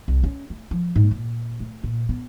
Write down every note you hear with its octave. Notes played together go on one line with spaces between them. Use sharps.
C2
C#4
A3
F3
G#2
A#2
A3
A#2
B3